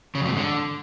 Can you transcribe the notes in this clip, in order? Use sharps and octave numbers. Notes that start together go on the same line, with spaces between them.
C#3
F2
C3
G#2
D3